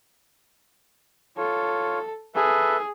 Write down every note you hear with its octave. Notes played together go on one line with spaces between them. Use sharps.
F4 A4 C#5
G#4 A4 B4 E5